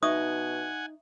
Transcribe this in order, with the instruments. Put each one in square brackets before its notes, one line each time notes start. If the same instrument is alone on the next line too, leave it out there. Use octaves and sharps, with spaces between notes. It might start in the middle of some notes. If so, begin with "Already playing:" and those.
[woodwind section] B2 [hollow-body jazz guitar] D#4 [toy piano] E5 C#6 D#6 [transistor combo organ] F#5 G#5